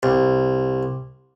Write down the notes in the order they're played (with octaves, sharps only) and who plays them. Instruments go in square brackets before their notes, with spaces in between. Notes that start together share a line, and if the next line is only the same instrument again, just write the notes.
[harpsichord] C2